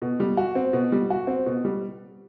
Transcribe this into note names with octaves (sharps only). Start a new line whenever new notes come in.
B2
G3
F#4
C4
B2
G3
F#4
C4
B2
G3